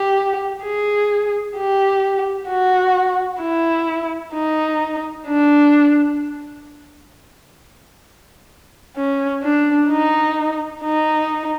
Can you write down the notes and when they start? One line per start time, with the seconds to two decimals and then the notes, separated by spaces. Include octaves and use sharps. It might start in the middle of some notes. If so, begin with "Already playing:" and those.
Already playing: G4
0.64 G#4
1.57 G4
2.49 F#4
3.42 E4
4.34 D#4
5.27 D4
8.96 C#4
9.43 D4
9.89 D#4
10.82 D#4